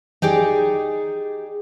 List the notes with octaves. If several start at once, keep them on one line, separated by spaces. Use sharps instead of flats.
D#4 G4 G#4 D5